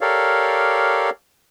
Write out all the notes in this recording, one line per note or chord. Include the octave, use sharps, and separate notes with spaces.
G4 A4 A#4 C#5 D5 F5